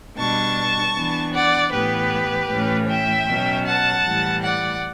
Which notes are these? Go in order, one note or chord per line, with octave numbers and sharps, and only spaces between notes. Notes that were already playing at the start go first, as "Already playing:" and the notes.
B2 G3 D4 A5 C#6
E3 B3 D4
D5 F#5
A2 E3 B3 G4 B4
A2 E3 A3 C#4
E5 G5
B2 F#3 C#4
F#5 A5
A2 E3 G3
D5 F#5